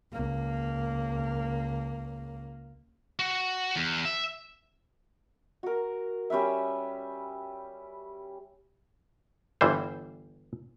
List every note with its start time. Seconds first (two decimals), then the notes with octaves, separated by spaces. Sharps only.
0.13 C#2 A#3
3.19 F#4
3.76 E2
4.05 E5
5.63 F#4 A#4
6.30 G3 C#4 B4 E5
9.61 G1 E3 G3 C5